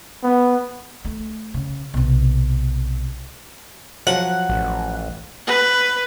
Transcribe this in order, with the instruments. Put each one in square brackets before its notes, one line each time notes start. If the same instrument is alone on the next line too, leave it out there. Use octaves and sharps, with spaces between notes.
[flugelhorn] B3
[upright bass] A3
C#3
B1 C3
[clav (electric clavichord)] F3 F#3 [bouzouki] F#5
[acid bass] A1
[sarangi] B4